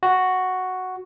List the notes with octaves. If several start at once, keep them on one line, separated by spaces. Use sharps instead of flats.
F#4